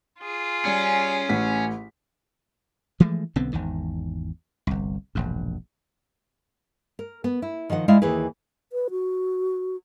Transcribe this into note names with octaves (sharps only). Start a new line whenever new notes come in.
F4 G#4
G3 C#4
A1 A2 B6
E3 F3 G#3 A3
B1 D3 B3 C4
G#1 E2 D#3
G1 C2
E1 A#1 G2
A#4
B3
E4
D#3 F3 D#5 F#5
G#3 E4 D5 E5 F5
D#2 E3 E4 G#4 B4
B4
F#4